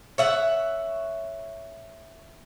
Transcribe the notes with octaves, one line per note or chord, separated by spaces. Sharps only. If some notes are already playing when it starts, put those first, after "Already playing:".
C#5 E5 F#5